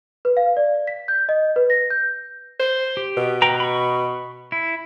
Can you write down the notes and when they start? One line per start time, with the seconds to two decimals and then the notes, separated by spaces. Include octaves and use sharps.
0.25 B4
0.37 F5
0.57 D5
0.87 B6
1.08 G6
1.29 D#5
1.56 B4
1.70 A#6
1.90 G6
2.60 C5
2.97 G4
3.17 B2
3.42 B4 G5 A#5
3.60 B5 C#6
4.52 E4